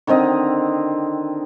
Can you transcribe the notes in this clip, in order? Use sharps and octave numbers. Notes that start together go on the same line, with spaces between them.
D3 D#3 C4 D#5